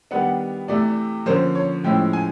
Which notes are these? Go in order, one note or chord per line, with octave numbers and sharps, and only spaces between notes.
D#3 G3 B3 D4 F#5
C3 E3 A3 D5
D3 F3 A#3 C#4 C5
C#5
A2 F3 G#3 C#4 E4 G5
G#5